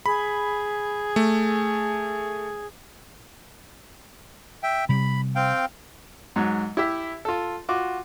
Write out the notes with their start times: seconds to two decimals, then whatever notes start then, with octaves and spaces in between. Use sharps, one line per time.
0.06 G#4 B5
1.16 A3
4.63 E5 G5
4.89 C3 G3 B5
5.35 C4 F5 G5
6.36 G#2 F#3
6.77 E4 G4 E5
7.25 F4 A4
7.69 F4 F#4 D6